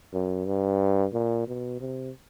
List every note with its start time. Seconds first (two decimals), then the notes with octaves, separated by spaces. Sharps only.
0.13 F#2
0.46 G2
1.13 A#2
1.47 B2
1.80 C3